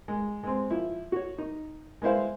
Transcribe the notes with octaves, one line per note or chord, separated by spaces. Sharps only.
G#3
G#3 C4
F3 E4
F#4 C#5
D#4
G#3 B3 E4 C5 F5